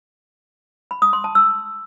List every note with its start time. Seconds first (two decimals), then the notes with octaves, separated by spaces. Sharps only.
0.91 B5
1.02 D#6
1.13 C6
1.24 A5
1.35 E6